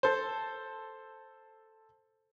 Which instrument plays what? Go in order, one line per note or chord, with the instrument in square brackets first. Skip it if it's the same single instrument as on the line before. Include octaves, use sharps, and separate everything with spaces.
[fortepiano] A4 C5